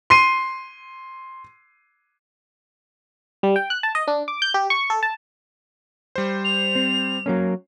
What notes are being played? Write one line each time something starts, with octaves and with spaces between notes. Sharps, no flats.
C6 C7 D#7
G3
G5
F#6
A5
D#5
D4
D6
G6
G4
C#6
A4
A5
G3 C5
F7
C4
F#3 A#3 C#4